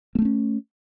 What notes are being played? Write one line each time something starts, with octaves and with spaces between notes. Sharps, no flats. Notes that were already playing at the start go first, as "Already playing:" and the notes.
A3 A#3 C4 C#4